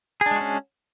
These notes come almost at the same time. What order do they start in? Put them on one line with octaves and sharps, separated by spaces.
G#4 D4 G#3 F#4 C#4